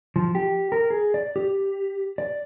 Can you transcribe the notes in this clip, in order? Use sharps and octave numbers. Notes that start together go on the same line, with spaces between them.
F3
G4
A#4
G#4
D5
G4
D5